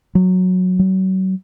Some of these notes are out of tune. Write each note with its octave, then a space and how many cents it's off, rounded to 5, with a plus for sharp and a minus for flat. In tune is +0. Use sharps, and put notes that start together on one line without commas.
F#3 -10
F#3 +35